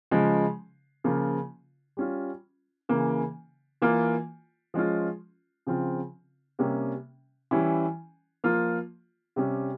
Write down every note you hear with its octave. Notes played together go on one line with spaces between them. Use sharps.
C#3 F3 G#3
C#3 F3 A#3 F4
G3 C#4 F4
C#3 E3 A#3
E3 A#3 F4
F3 G#3 C#4 F4
C#3 F3 C4 F4
C3 G3 A#3 C#4
E3 G3 C#4 E4
F3 A#3 F4
C3 G3 C#4